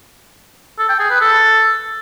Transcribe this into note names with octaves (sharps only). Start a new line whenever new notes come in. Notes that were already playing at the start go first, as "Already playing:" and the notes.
A4
G5
G#4
B4
A4